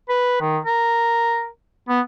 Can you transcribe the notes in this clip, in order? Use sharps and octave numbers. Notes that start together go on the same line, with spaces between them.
B4
D#3
A#4
B3